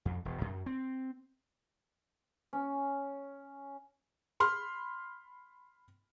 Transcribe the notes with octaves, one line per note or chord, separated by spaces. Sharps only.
F2
E1
F#2
C4
C#4
B5 C6 F6